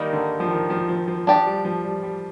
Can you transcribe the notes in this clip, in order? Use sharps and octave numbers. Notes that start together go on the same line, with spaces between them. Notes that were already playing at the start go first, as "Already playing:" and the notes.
Already playing: D#3 G3 A#3 D#4 A#4
D3
F3
D#3
F3
F3
F3
F3 D4 G4 D5
G3
F3
G3
G3